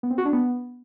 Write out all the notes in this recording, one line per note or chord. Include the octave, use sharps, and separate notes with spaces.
B3
C4
F#4
D4
B3